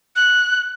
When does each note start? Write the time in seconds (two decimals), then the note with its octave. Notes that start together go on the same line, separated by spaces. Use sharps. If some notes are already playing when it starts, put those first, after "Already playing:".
0.16 F#6